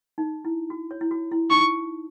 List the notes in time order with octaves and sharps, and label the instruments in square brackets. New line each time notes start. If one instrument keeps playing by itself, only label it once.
[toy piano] D#4
E4
F#4
C#5
E4
F#4
E4
[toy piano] D#4 [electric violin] C#6